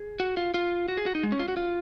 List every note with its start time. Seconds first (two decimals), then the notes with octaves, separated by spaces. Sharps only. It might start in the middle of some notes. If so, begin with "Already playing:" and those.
Already playing: G#4
0.20 F#4
0.37 F4
0.54 F4
0.88 F#4
0.97 G#4
1.06 F#4
1.15 D#4
1.23 G#3
1.32 C#4
1.39 F4
1.48 F#4
1.57 F4